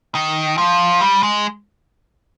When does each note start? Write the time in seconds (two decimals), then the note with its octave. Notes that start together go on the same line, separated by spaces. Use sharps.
0.15 D#3
0.58 F3
1.01 G3
1.23 G#3